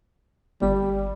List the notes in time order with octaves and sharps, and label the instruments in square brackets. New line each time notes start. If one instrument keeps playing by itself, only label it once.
[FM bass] G1 [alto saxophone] G3